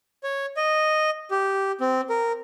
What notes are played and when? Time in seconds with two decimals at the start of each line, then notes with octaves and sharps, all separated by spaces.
0.23 C#5
0.57 D#5
1.31 G4
1.81 C4
2.10 A#4